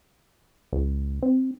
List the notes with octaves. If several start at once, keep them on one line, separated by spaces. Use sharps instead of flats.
C#2
C4